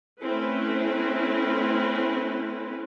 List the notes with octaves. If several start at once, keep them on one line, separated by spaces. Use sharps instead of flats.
A3 C4 C#4 E4 B4